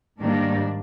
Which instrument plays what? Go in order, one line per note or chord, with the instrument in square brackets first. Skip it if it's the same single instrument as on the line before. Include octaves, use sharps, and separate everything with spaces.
[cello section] G#2 D#3 G3 A#3 D4